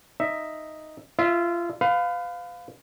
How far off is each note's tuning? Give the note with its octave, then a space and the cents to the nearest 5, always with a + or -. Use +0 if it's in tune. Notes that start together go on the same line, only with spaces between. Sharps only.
D#4 +0 E5 +5
F4 -25 E5 +0
B4 +35 F5 +15